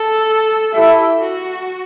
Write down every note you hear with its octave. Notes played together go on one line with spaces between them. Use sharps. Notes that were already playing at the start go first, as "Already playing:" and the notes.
Already playing: A4
E4 G4 A4 E5
F#4